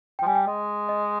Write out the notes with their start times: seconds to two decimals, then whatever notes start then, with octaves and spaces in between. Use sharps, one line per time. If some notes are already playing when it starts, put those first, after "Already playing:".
0.19 G5
0.23 F3
0.26 G3 G#5
0.35 G5
0.47 G#3 D#5
0.89 D#5